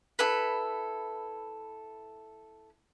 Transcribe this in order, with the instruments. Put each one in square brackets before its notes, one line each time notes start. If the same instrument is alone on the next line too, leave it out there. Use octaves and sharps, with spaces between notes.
[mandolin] E4 A4 B4